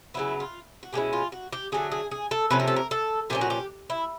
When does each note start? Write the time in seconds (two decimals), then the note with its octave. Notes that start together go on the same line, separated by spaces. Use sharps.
0.14 C#3 F#3 B3 E4
0.40 F4
0.83 F#4
0.93 B2 G#3 C#4 E4 G4
1.13 F4
1.32 F#4
1.52 G4
1.72 D3 F#3 A3 G#4
1.92 G#4
2.11 G#4
2.31 A4
2.50 C3 F3 A3 C#4 B4
2.60 A#4
2.68 A4
2.76 A#4
2.91 A4
3.30 A#2 F3 A3 C#4 G4
3.41 F#4
3.50 G4
3.90 E4